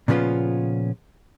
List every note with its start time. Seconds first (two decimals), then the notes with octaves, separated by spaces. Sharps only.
0.08 A#2 C#3 F3 B3 C#4 F4